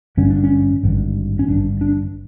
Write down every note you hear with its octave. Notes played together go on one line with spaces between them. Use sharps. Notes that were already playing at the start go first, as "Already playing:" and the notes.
G#1 G2 D3 C#4
D4
C#4
G#1 G2 D3
C#4
G#1 G2 D3 D4
D4